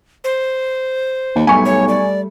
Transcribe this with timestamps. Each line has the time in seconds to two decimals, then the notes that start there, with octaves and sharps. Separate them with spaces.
0.24 C5
1.35 D#2
1.47 B1 G3 A3 G#5 C#6
1.65 C#5
1.88 D5